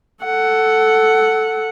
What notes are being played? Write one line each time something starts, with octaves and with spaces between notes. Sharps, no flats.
A4 F#5